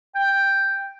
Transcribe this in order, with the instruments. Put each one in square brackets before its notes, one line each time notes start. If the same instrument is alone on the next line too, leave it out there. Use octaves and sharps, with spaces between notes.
[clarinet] G5